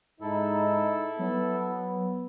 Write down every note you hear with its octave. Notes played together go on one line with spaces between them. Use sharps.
G#2 D#4 E4 A4
F#3 B3